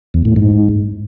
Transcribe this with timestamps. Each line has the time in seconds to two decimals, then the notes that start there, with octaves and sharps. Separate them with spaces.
0.14 E2
0.25 A2
0.36 G#2